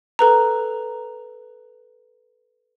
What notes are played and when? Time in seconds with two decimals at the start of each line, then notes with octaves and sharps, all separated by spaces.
0.19 A4 B4 A#5